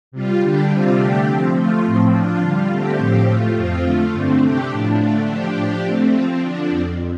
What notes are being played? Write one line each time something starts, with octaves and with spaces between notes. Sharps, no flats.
C3 G3 F4
D3 G3 D4 G4
C3 G3 C4 F4
D3 A3 D4 G4
F3 C4 G4
F3 A3 F4
A2 F3 C4
F3 D4 F4
D3 G3 F4
D3 A3 C4 G4
A2 F3 C4 G4
A2 A3 F4
F2 F3 C4 F4
D3 A3 F4
G2 D3 A3 C4
C3 A3 D4 G4
A2 F3 D4
D3 A3 D4 F4
D3 F3 D4 G4
A2 F3 D4 G4
D3 A3 C4
F3 C4 F4
D3 F3 D4
F2 F3 C4